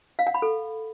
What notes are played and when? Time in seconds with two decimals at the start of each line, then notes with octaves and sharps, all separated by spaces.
0.19 F5
0.27 F#5
0.34 B5
0.42 A4